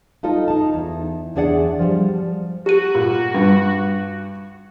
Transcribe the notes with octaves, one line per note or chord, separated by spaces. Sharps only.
D#4 F4 A4 D#5
D#4 A5
E2
E2 D4 G#4 D5 F#5
F3 G3
F#4 G4 D#7
A#2
G2